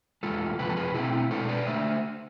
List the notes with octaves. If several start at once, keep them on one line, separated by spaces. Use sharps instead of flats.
E2 C3 G#3 F4 A4
F2 C3 F3 B4
A4
G#4 B4
B2 A3 C4 E4 G#4
E4
B2 G#3 D4 A4 C5
B4 D5
D3 A3 C5 E5